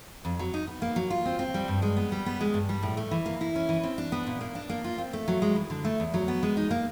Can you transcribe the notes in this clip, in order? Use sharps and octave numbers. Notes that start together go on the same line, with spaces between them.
F2
F#3
D#4
B3
A#3
F#3
F4
C4
C4
G3
G2
G#3
B3
G3
B3
G#3
G2
G3
A2
A3
E3
A#3
E4
C#4
E3
C4
D4
B3
A#2
A#3
D4
A#3
F4
C4
A3
F#3
G#3
E3
D3
A3
E2
F#3
B3
G#3
D#4
A#3